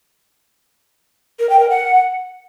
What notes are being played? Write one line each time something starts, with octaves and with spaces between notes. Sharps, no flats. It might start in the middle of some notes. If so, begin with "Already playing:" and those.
A#4
G5
A#4
F#5